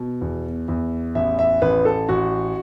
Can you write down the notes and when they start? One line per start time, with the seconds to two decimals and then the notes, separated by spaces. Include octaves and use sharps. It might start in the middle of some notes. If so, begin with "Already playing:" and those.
Already playing: B2
0.21 E2
0.68 E2
1.15 A1 E5
1.39 E5
1.62 A1 B4
1.85 A4
2.09 A1 F#4